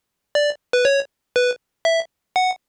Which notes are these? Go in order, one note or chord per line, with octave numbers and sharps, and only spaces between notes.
D5
B4
C#5
B4
E5
F#5